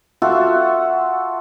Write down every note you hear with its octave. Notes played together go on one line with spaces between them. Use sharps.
F4 F#4 A4 E5